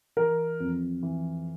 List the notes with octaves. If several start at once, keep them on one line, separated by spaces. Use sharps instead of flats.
E3 A#4
F2
E3